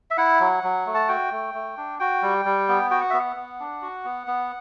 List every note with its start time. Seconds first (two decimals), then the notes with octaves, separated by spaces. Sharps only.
0.11 E5
0.17 E4 F#5
0.40 F#3
0.64 F#3
0.86 A3
0.94 A5
1.08 F#4 G5
1.31 A3
1.54 A3
1.77 D4
1.99 F#4 G5
2.22 G3
2.45 G3
2.69 B3
2.91 F#4 G5
3.01 F#5
3.10 B3 E5
3.20 F#5
3.36 B3
3.60 D4
3.82 F#4
4.05 B3
4.27 B3